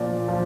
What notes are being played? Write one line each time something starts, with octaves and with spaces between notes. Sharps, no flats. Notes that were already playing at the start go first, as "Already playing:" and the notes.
Already playing: A#2 F3 D5
F3